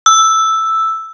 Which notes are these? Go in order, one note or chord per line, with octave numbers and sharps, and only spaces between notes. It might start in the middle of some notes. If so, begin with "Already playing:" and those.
E6